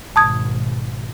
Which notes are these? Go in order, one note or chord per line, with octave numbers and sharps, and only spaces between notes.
G#1 B2 A5 D#6 G#6